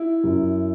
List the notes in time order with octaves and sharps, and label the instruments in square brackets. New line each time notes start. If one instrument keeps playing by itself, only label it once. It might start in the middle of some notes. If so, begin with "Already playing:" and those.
Already playing: [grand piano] E4
F#2